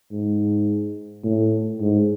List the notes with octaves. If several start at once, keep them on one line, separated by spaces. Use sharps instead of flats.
G#2
A2
G#2